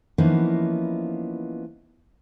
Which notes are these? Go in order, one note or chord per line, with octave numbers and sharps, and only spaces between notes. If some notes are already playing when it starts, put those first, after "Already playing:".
E3 F3 A#3 B3 C#4 D#4